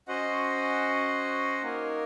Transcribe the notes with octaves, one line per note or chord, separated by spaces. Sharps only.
C#4 F#4 C5 D#5 F#5
A#3 D#4 A#4 C#5